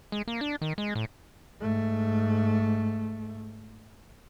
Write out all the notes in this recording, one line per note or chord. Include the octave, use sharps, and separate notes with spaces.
G#3
A#3
D4
D#3
G#3
A2
G#2 A3